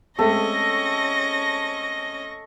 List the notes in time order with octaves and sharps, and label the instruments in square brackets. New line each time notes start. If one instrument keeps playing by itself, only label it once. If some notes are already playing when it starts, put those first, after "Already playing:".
[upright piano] G#3 A3 C4 [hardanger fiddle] C#4 D#5 [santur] A4 [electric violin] C#6 A#6